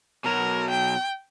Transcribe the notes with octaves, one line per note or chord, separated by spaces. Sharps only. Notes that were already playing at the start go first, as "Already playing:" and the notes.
B2 F#3 A#4
G5